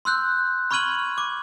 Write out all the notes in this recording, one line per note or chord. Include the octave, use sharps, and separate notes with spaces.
C6 E6 F#6 G6
B5 C#6 F6 G#6 D#7 F#7
D6